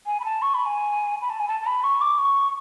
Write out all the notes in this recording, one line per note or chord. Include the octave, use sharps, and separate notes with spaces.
G#5
B5
A5
C#6
B5
G#5
B5
A5
G#5
A5
A5
B5
C#6
D6
C#6